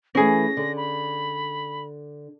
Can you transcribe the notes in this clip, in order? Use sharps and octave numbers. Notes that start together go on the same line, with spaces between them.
E3 A3 C#4 G#4 A#6
D3
B5